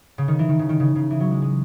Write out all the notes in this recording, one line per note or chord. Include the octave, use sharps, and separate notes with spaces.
C#3
D#3
E3
D#3
C#3
D#3
C#3
C#3
E3
F#3
G#3
G#3